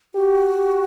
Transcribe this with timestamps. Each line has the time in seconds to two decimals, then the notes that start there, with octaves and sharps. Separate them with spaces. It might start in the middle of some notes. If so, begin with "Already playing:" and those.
0.14 F#4 G4
0.56 G4